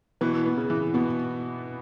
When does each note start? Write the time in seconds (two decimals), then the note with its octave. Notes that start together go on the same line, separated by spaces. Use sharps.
0.21 B2 E3 B4
0.46 B3
0.57 C#3
0.70 E3
0.94 B2 B3